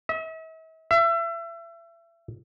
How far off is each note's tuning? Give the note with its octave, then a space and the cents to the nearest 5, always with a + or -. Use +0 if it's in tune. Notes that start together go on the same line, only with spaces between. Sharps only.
E5 -45
E5 +30